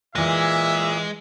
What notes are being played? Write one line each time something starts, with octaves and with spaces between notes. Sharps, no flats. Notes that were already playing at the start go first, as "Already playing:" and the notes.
A#2 E3 G#3 E5 A#6